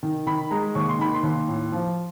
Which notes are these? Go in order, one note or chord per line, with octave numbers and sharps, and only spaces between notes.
D#3
D#3 B5
G#3 A#5
D#2 C#6
C6
D#3 B5
C6
D#2
A2
F3